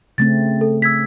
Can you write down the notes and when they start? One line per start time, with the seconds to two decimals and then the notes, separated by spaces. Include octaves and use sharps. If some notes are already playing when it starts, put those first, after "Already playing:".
0.18 C#3 A3 C4 A6
0.61 A4
0.82 E6 G#6 B6